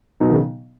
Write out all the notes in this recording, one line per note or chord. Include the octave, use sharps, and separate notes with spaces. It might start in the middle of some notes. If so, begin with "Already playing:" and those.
B2 F#3 B3 D#4
D#3
C#3